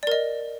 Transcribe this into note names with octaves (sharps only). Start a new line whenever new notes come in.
A#4 D5 D#5